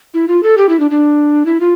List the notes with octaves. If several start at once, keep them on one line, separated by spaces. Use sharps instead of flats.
E4
F4
A4
G4
E4
D4
D4
E4
F4